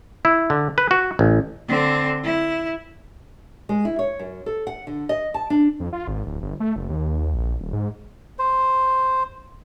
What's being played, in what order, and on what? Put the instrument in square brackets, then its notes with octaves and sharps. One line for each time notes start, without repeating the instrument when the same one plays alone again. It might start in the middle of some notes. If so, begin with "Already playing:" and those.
[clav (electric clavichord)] E4
D3
B4
F#4
A1
[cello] D3 C4
E4
[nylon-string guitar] G#3
E4
C#5
F#2
A4
F#5
D3
D#5
A5
D4
[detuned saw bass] F2
F4
G#1
D1
G1
A3
F#1
D#2
A#1
D#1
G#2
[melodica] C5